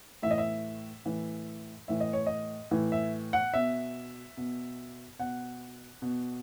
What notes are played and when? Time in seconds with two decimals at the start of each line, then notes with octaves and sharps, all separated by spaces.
0.22 A2 E3 E5
0.31 D#5
0.38 E5
1.05 A2 E3
1.88 A2 E3 E5
2.00 D#5
2.13 C#5
2.26 D#5
2.71 A2 E3
2.92 E5
3.33 F#5
3.54 B2 E5
4.37 B2
5.19 B2 F#5
6.02 B2